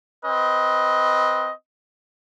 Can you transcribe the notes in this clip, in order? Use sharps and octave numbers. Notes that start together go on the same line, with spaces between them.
C4 B4 D#5